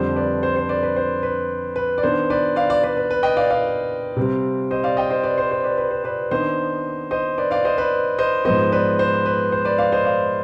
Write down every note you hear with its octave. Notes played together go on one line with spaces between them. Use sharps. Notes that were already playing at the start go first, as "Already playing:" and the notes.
Already playing: F2 D3 G3 D4 C5
B4 D5
C5
C5
B4 D5
B4
C5
B4
B4
D5
D#3 B3 D4 C5
B4 D5
D5 F5
D5 F5
B4 D5
B4
B4
D#5 G5
D5 F5
D5 F5
C3 G3 C4
C5 D#5
D5 F5
D#5 G5
C5 D#5
B4 D5
C5
C5
B4 D5
B4
C5
B4 D5
D#3 B3 D4 C5 D#5
C5 D#5
B4 D5
D5 F5
C5 D#5
B4 D5
C5 D#5
G#2 F3 B3 C5 D#5
B4 D5
C5
B4
C5
B4 D5
D5 F5
C5 D#5
D5 F5